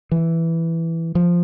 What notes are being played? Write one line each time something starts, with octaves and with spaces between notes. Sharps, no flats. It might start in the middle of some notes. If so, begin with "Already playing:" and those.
E3
F3